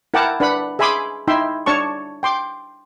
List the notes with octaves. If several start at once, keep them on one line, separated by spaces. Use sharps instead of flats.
E4 A#4 F#5 G5 A5 D6
D4 B4 F#5 B5
G#4 E5 G#5 B5 C6 D6
D#4 E4 E5 G5 C6
D4 C#5 A5 C#6
G5 C6 D6